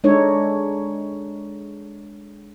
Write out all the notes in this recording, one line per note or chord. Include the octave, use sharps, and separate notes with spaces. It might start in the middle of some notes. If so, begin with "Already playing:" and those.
G#3 D4 D#4 A4 C#5